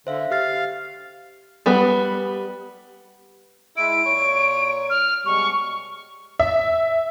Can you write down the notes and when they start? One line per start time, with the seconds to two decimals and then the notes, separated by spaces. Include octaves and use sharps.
0.07 D3 C5 E5 F5
0.31 G4 F5 F6 A6
1.66 G3 B3 B4
3.77 G#3 E4 D7
4.07 A#2 C#5
4.90 F6
5.26 B2 G3 G#3 C#6
6.40 E5